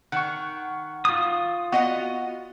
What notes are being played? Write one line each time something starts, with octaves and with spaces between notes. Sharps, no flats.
D#3 F#5 C#6
F4 D#6
B3 F#4 D#5 F#5